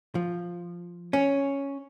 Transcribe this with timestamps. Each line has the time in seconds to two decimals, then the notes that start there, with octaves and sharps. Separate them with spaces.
0.15 F3
1.13 C#4